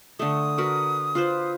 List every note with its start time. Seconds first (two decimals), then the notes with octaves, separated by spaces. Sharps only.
0.19 D3 A3 D#6
0.58 F#4 A#4 B4
1.15 F4 B4 C5